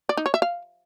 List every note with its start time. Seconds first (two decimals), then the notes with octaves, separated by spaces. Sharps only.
0.09 D5
0.17 D#4
0.26 C#5
0.34 E5
0.42 F5